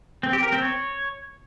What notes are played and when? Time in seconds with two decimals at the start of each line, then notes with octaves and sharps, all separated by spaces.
0.23 C4
0.33 G4
0.43 A#4
0.52 C4
0.62 C#5